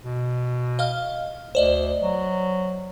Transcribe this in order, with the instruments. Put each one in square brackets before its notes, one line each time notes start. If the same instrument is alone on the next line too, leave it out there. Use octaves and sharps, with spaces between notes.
[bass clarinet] B2
[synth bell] D#5 F5 F6
[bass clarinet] D2 [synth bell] C5 D5 D#5
[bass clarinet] F#3